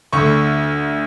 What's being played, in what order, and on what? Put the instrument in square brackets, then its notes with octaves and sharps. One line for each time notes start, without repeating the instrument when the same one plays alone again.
[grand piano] D2 D3 C#6